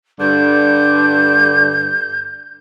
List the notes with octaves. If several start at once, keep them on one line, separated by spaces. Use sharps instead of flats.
G2 D3 G6